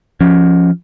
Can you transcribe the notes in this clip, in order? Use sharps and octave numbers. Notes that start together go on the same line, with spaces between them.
F3 C#4